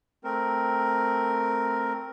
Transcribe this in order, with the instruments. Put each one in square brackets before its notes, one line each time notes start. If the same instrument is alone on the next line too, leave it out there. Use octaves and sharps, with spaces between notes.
[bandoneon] A3 C4 A#4